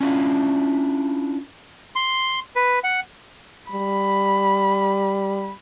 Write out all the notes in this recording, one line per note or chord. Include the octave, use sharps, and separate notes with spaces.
C#4 D4 E4 F4 F5
C6
B4
F#5
G3 B5